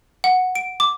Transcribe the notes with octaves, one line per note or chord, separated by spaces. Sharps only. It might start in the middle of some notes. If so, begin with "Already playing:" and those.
F#5
D7
D6